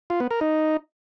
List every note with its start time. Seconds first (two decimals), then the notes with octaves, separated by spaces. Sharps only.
0.10 F4
0.20 B3
0.31 A#4
0.41 D#4